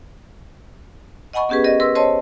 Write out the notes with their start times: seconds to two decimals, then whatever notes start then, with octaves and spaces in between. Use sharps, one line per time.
1.33 D#5 F#5 G#5 B5 C#6
1.49 B3 C#4 G4 G#4 B4
1.64 G4 A#4 D5 D#5
1.80 A#4 B4 C6 E6
1.95 C5 C#5 D#5 A5 C6